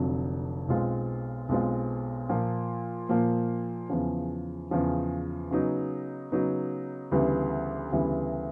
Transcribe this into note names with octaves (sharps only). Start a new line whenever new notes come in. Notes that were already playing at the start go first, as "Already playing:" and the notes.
Already playing: F1 F2 D3 F#3
B1 B2 G#3 C4 F4
B1 B2 G#3 C4 F4
A#2 F3 A#3
A#2 F3 A#3
E2 C#3 F3
E2 C#3 F3
C#3 F#3 B3 D#4
C#3 F#3 B3 D#4
D2 C#3 E3 G3 B3
D2 C#3 E3 G3 B3